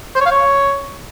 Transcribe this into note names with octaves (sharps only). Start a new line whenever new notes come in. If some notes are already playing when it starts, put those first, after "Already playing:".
C5
C#5
F5
C#5